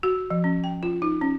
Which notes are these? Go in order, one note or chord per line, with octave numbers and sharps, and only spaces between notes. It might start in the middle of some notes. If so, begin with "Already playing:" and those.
F#4
F3
C#4
G5
F4
D#4
C#4